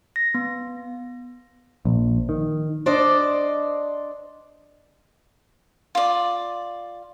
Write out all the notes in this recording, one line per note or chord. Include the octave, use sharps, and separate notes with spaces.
A#6
B3
A#1
D#3
D4 C5 D5 D#5
F4 D5